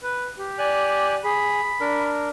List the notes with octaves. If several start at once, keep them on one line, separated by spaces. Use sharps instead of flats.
B4
G4
D5 G#5 F#6
G#4 B5
D4 A#4